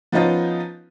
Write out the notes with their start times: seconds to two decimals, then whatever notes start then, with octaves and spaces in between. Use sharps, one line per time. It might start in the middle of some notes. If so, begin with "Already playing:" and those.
0.12 F3 B3 C#4 D#4 F4